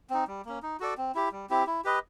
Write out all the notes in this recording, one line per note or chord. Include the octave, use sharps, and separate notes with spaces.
C4 D#4
G3
A#3 C#4
D#4
F#4 A4 D5
C4
E4 G4
G3
C4 E4 G4
E4
G4 B4 D#5